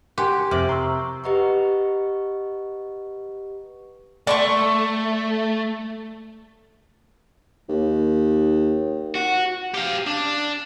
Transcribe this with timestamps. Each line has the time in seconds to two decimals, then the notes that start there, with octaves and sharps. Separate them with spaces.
0.18 G4 A#4 F#5 G#5 C6
0.51 F2 C3 D6 F6 F#7
0.69 A#5 C6 C#6 E6
1.24 G4 B4 D#5 F#5 A#5 C#6
4.27 A3 D5 C6 C#6
7.69 D#2
9.15 F#4
9.74 G4 F5
10.07 D4